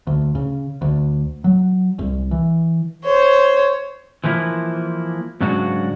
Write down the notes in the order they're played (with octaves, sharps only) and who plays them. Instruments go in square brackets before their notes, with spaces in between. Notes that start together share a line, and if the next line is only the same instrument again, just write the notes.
[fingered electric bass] D2
C#3
D2
F#3
C2
E3
[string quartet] C5 C#5
[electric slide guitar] E3 F3 A#3 E4
G#2 C#3 F#3 D4 F#4